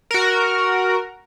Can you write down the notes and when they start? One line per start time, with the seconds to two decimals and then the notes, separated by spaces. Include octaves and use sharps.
0.11 F#4 A#4